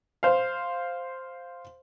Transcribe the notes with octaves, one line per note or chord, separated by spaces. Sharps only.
C5 F5